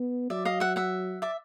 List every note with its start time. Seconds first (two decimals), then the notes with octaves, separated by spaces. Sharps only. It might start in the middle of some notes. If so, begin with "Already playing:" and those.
Already playing: B3
0.30 F#3 D5 E5
0.45 D#5 F5
0.60 E5 F#5
0.76 E5 F#5
1.22 D5 E5